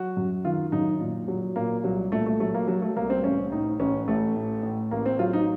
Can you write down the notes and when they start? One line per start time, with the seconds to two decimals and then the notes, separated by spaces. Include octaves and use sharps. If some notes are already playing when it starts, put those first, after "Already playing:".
Already playing: F#3 F#4
0.17 F#2
0.45 D#3 F4
0.72 F#2 D#4
1.01 A#2
1.28 F#3
1.56 A#2 A#3
1.84 C2 F#3
2.12 A#2 A3
2.26 A3
2.40 F#3 A3
2.54 A#3
2.68 F#3
2.82 A3
2.96 C2 A#3
3.10 C4
3.24 A1 C#4
3.52 A2 D#4
3.80 A1 C#4
4.08 A1 A3
4.36 A2
4.63 A2
4.91 A1 A#3
5.06 C4
5.19 F#3 F4
5.33 D#4